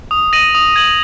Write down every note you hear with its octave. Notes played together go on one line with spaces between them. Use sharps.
D#6
A#6 D#7 F#7
D#6
G#6 D#7 F#7